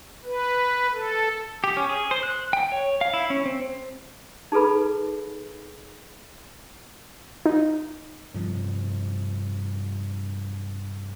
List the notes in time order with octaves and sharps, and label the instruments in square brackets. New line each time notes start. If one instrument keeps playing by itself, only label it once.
[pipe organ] B4
A4
[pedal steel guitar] G4
C#4
G#4
C5
F#6
G5
C#5
F5
E4
C#4
C4
[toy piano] D#4 G#4 A4 B4 B5
[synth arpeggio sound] D#4
[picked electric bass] G2 C3 F3